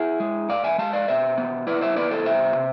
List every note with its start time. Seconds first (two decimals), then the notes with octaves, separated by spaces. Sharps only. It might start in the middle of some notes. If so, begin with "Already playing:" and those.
Already playing: E4 G#4
0.20 G#3
0.49 G#2 D5 F5
0.64 E5 G#5
0.78 G#3 F5 A5
0.93 D5 F5
1.08 B2 C5 E5
1.38 B3
1.67 E4 B4 D5
1.81 C5 E5
1.96 B3 B4 D5
2.11 A4 C5
2.25 C2 C5 E5
2.55 C3